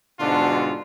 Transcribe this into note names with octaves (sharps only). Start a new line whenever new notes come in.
G#2 B2 D3 D4 F4 F#4